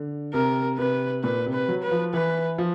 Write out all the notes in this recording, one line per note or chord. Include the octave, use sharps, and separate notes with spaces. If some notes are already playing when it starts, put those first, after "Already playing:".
Already playing: D3
C3 A#4
C3 B4
A#2 B4
C3
B4
F#3
B4
F3
E3 B4
F3